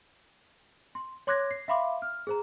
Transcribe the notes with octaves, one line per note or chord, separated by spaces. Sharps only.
C6
C#5 C6 D6 F#6 G#6 A#6
C7
E5 F5 B5 C6 D6
F6
G#4 C5 A#5